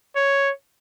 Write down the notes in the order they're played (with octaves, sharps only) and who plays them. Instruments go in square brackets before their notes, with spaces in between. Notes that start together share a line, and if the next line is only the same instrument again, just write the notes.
[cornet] C#5